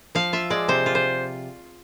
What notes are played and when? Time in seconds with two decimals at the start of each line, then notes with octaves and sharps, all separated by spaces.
0.15 F3 F5
0.33 F4 E5
0.50 G#3 D5
0.68 C3 C5
0.86 F4
0.95 C5